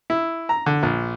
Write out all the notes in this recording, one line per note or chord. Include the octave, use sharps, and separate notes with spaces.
E4
A#5
D3
A#1